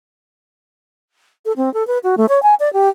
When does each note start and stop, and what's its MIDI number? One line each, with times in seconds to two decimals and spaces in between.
1.45 1.52 69
1.57 1.72 60
1.74 1.86 69
1.87 1.98 71
2.03 2.15 66
2.17 2.26 57
2.29 2.42 73
2.43 2.55 80
2.60 2.72 74
2.73 2.89 67